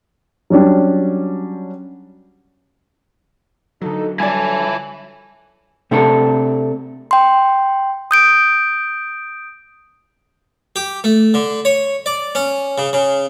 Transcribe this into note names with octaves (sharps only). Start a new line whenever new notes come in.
F#3 G3 C#4 D4 G4
D3 F#3 D#4 A4
G3 E4 A4 C#5 D5 G#5 A5
C3 A3 D4 A4
G5 C6
D#6 G6 D7
G4
A3
D3
C#5
D5
C#4
C#3
C#3